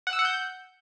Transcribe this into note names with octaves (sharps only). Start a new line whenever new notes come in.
F#5
E6
F#5
G6